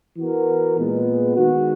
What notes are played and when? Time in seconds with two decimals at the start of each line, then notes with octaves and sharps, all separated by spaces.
0.17 E3 B3 F#4 A#4
0.77 A#2 G#3 B3
1.36 D#3 G#3 B3 F#4